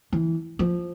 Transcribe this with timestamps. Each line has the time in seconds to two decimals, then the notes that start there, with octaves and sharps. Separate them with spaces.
0.13 E3
0.59 F3